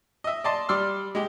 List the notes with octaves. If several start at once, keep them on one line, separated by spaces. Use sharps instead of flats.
D#5 E5
D5 D#5 A5 C6
G3 D5 C6 E6 F6
G#3 G4